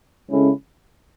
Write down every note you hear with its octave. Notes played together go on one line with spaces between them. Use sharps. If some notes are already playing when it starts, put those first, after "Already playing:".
C#3 G#3 C#4 E4 A4